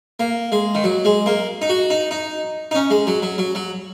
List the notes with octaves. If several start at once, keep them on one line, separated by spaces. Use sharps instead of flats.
A#3
G#3
D#3
F#3
G#3
A#3
D#4
F#4
D#4
D#4
D#4
C#4
G#3
F#3
F#3
F#3
F#3